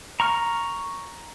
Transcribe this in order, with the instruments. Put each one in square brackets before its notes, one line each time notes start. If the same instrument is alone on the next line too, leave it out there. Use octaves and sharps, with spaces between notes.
[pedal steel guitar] A#5 C#6 F6